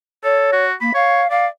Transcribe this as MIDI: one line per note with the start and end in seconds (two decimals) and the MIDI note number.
0.24 0.51 69
0.24 0.65 73
0.52 0.73 66
0.81 0.93 58
0.81 0.91 83
0.94 1.23 73
0.94 1.30 77
1.30 1.47 74
1.30 1.46 77